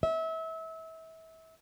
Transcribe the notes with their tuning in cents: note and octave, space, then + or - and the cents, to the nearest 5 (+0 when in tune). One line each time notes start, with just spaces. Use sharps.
E5 -30